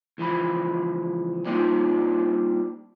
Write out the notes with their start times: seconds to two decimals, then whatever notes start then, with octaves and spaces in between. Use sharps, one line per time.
0.18 C#2 E3 F3 B5
1.45 G3 A#3 C4 D4 D#4 F4